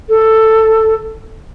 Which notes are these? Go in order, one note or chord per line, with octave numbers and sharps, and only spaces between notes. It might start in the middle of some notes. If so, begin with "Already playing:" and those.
A4